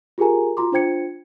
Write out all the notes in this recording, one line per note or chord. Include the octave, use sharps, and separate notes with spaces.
F4 G4 G#4 A#4 G#5 A#5
F4 F#4 A#5 C6 D6
D4 F4 C5 G5 G#6 C#7